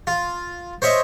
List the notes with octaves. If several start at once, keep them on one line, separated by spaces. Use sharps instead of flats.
F4
C5 C#5 D#5 E5